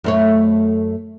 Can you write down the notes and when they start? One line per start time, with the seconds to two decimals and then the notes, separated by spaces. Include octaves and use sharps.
0.04 F#2 A3 C#5